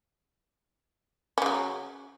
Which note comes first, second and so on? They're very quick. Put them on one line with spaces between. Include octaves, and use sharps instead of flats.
C#4 C#3 F#3